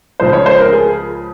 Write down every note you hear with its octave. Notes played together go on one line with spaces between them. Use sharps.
C#2 C#3 F3 C5
C#5
C5
A#4
G#4